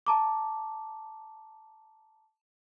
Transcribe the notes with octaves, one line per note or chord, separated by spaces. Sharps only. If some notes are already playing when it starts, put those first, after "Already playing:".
A5 A#5 D6